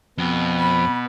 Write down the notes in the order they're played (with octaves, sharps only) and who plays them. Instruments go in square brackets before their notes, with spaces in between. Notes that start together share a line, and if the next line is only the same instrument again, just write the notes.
[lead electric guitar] F2 [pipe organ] B2 B3
[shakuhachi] B5